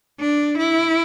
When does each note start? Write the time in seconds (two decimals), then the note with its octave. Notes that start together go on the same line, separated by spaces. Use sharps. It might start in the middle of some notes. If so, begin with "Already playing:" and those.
0.20 D4
0.58 E4